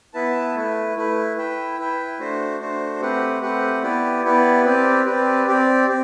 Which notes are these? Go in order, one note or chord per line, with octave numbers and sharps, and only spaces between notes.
B3 E4 B4 E5 A5
A3 E4 B4
A3 E4 B4
E4 B4 E5 G5
E4 B4 E5 G5
A3 D4 F#4 C5
A3 D4 F#4 C5
A3 C4 G4 B4 F#5
A3 C4 G4 B4 F#5
B3 E4 G4 B4 D5
B3 E4 G4 B4 D5
C4 G4 B4 D5
C4 G4 B4 D5
C4 G4 D5
C4